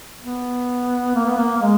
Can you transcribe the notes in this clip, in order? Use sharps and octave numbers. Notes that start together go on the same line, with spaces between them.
B3
A#3
B3
A#3
A#3
G#3